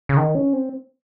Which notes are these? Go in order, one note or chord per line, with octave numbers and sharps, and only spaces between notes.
C#3
D#3
C#4
C4